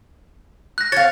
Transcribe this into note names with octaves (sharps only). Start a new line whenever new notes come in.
F#6 A#6
C#5 F5 A6